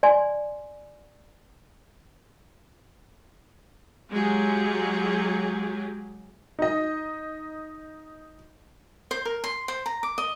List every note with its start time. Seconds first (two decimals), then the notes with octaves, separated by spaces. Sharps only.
0.03 D5 G#5 C6
4.09 F#3 G#3 F4 G4 G#4
6.59 D#4 D#5
9.11 C5
9.25 A#4
9.44 C6
9.68 C5
9.86 A#5
10.03 D6
10.18 D#5